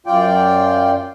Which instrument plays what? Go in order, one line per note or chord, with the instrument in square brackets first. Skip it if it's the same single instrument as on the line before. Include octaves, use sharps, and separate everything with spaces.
[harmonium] F#2 F4 D5 G5